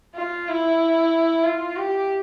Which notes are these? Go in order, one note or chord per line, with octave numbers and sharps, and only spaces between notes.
F4
E4
F4
G4